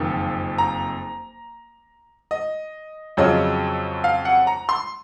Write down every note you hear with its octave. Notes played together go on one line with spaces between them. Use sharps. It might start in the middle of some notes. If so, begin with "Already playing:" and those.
Already playing: F#1 F2 D#3
A#5
D#5
F2 C#3 F#3 C#4 F4 D#5
F5
F#5
A#5
C6